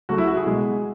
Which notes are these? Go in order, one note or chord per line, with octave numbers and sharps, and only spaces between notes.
C#3 F#3 A3 F#4
E4
F#4
G#4
B2 G#3